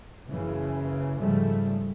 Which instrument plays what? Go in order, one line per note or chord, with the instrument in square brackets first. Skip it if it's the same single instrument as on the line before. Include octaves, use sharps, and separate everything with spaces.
[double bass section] F#1 C#3 E3
G#2 C#3 F3 G3 A3